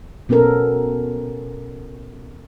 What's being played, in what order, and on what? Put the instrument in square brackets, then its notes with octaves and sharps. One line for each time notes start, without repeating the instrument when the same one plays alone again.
[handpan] B2 B3 C#4 A4 A#4